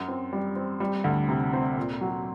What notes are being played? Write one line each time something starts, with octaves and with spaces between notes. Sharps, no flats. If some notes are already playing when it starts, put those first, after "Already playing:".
Already playing: F#2
C4
G3
C4
G3
D2
C3
C4
A#2
F#3